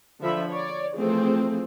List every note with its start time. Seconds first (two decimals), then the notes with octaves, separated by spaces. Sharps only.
0.21 D3 F3 E5 B5
0.51 C#5 D5
0.96 E3 F3 A3 C4 G#4